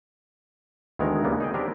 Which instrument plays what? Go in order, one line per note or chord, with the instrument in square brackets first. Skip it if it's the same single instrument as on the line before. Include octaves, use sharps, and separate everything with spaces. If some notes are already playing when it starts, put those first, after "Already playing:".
[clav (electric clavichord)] D2 D#3 E3 G#3 B3 A#4
C#3 E3 G3 A#3 B3
D#4 G#4 G5
C4 D4 G4 A#4 B4